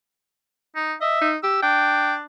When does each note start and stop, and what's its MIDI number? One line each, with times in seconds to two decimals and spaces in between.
0.75 0.94 63
1.01 1.18 75
1.01 1.29 76
1.21 1.37 63
1.43 1.62 67
1.43 1.60 88
1.63 2.24 62
1.63 2.14 79